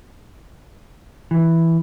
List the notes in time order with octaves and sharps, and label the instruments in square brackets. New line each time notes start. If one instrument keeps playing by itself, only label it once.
[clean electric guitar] E3